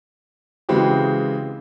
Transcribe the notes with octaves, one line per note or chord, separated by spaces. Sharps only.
C#3 E3 G#3 C4 F#4 G4